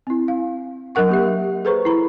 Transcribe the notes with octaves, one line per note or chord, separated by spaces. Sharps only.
C4 E4
F5
F#3 D4 A#4 F#5 C#6
A#3 G4 E5
G#4 A4 B4 C5 A#5 C#6
E4 A#5 B5